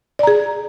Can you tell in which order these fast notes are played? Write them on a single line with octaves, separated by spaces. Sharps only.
D5 A#5 G#4